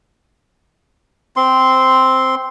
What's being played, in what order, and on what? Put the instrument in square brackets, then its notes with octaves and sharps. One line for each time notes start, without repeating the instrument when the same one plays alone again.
[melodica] C4 C6